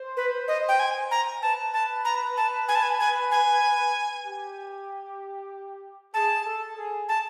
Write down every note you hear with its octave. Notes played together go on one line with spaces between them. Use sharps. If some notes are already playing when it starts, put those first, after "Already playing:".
Already playing: C5
B4
D#5
G5
G#5
A#5
B4 A5
A5
A#5
A5
G#5
A5
G#5
G#5
G#5
G4
G#4 A5
A4
G#4
A5